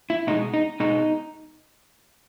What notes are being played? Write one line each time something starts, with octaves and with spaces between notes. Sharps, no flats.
E4
B2 G#3 D#4
D#4
B2 G#3 D#4